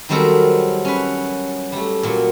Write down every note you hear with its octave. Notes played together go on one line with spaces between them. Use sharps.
D#3 F#3 G3 C4 A4 A#4
C#4 B4
G3 A3
A#2 F#3